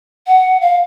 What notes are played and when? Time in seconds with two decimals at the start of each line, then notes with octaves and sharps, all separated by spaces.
0.27 F#5
0.61 F5